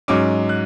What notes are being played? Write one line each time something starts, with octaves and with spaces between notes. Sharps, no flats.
G#2 F#3 C#4 D6
F#6